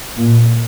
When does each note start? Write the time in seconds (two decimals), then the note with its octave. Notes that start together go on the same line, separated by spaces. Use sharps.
0.17 A#2